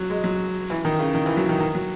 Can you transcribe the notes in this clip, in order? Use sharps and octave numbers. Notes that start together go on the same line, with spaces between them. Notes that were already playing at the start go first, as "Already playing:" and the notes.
Already playing: F#3
G#3
F#3
E3
D#3
C#3
D#3
E3
F#3
D#3
D#3
F#3